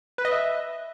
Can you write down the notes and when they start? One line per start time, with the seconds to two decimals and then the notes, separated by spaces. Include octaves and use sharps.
0.18 B4
0.25 D#5
0.31 E5